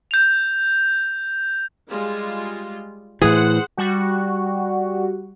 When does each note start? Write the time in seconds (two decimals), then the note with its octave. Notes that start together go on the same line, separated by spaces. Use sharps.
0.11 G6 F7
1.88 G3 G#3 F4
3.22 A2 E3 G#4 C5 F#5
3.77 G3 F#4